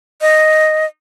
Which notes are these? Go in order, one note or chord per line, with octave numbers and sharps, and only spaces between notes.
D#5